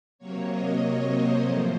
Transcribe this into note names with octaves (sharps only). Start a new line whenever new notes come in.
C3 F#3 A#3 C#5
D#5
C#5
C5
A2 F3 A3 C5